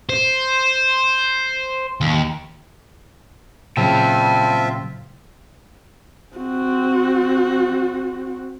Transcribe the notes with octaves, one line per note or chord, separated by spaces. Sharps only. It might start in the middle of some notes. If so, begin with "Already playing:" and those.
C5
D#2
A#2 C#3 F#3 C4 F4 E5 G5 A5
C4 F#4